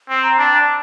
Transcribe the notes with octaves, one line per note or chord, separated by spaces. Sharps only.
C4
A#5
D4 A5